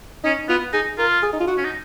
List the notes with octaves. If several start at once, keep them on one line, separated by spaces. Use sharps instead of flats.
C#4 D#4
B3 F4
D#4 G#4
F4 A#4
G#4
D#4
F4
F#4
C#4
D#4